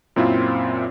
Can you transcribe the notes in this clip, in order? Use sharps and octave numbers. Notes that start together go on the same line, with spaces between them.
F#2 A#2 C4 E4 F4